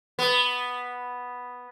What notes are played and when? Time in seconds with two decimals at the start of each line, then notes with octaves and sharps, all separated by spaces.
0.19 B3